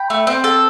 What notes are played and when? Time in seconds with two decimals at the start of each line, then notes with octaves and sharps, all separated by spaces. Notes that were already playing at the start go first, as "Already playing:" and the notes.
Already playing: G5 B5
0.10 A3
0.27 C4
0.44 A4